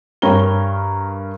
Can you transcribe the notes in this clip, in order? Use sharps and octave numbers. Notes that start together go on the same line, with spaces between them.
G2 A#4 C#5 A#5 G7